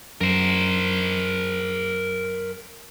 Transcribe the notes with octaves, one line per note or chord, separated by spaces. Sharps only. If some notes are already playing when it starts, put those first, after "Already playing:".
F#2 A#4 C5